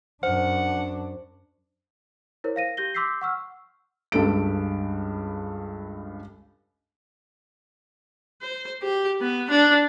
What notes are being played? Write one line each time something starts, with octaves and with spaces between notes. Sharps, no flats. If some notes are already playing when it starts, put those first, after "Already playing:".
F#2 D4 C5 F#5
E4 A#4 C5 C#5
F5 A#6 D#7
G4 G6 A#6 G7
C6 D6 E6 G6 B6 C7
F#5 C#6 E6 F6
C#2 G2 A4 D7
C5
G4
B3
D4